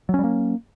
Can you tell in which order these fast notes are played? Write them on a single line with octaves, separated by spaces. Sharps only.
F#3 C#4 G3 A#3